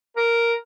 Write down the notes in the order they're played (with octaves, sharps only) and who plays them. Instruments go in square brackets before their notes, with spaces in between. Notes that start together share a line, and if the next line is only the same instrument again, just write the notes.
[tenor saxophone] A#4